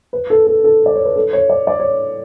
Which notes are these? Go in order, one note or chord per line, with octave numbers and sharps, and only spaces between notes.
B4
A4
A4
A4
D5
C#5
B4
A4
C#5
D5
D5
C#5